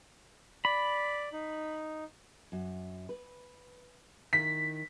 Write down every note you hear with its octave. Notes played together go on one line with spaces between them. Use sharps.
D5 B5
D#4
F#2 F#4
B4
D#3 E4 B6